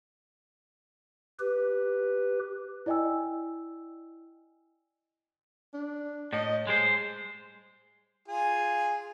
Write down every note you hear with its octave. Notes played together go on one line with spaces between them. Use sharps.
G4 B4
E4 D5 D#5 G5 G#5 E6
D4
A2 D#5
G3 G#3 C5
F4 G#4 G#5